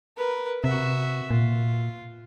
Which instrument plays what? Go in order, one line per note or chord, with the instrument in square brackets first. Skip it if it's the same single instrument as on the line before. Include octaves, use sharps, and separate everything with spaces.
[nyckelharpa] A#4 B4
[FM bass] C3 [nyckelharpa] F#4 E5
[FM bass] A#2 [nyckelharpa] F4